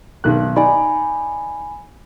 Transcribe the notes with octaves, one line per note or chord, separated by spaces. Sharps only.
B1 D#3 F#6
D#4 D5 G#5 B5